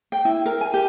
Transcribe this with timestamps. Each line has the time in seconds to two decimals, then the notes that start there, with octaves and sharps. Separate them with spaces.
0.12 G5
0.25 E4
0.46 A#4
0.61 G#5
0.74 G4